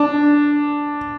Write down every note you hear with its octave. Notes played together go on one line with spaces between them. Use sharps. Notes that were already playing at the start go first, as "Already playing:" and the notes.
Already playing: D4